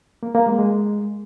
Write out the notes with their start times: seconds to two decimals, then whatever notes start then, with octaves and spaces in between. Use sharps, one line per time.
0.23 A#3
0.35 A#3
0.47 G#3
0.59 G#3